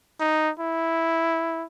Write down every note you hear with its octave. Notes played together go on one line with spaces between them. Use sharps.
D#4
E4